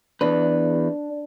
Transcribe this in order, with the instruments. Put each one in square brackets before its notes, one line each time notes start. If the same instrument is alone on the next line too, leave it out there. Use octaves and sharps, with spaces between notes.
[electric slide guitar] E2 B4 [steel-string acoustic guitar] D4